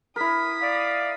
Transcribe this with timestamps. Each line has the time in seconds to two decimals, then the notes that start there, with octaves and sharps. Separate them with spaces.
0.16 E4 A#4 D#6 B6
0.62 D5 F5